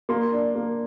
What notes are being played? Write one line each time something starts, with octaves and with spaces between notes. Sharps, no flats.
A#3 C6
D4
A#3